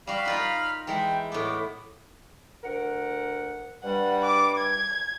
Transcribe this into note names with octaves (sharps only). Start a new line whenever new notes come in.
G3 F#4 F5 B5 F6
D#4 F4 A#4
E3 G#3 E4 G5
A2 B3 D6
D2 A#4 F#5
G2 G3 F#5
D6
G#6